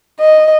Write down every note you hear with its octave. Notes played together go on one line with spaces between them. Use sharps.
D#5